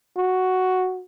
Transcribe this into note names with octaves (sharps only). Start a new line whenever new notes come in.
F#4